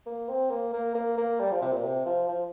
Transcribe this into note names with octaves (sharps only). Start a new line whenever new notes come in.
A#3
C4
A#3
A#3
A#3
A#3
G3
F3
C3
A#2
C3
F3
F3